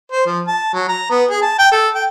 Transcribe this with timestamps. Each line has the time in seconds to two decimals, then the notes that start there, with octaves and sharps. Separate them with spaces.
0.12 C5
0.26 F3
0.48 A5
0.74 F#3
0.88 A#5
1.11 B3
1.31 G#4
1.42 A5
1.59 G5
1.72 A4
1.95 G5